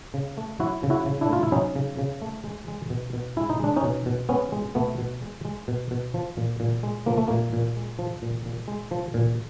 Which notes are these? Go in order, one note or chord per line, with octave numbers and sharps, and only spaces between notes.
C#3
A3
F#3 E4 F#4
C#3
E4 F#4
C#3
D4 E4
A3 F4
E4
F#3 C#4 D#4
C#3
C#3
A3
G#3
G#3
B2
B2
G#3 E4
D#4
G#3 D4
C#4 D#4
B2
B2
G#3 B3 C#4
G#3
B2 A3 B3
B2
G#3
G#3
B2
B2
F3
A#2
A#2
G#3
F3 A#3
A3
A#2 A#3
A#2
G#3
F3
A#2
A#2
G#3
F3
A#2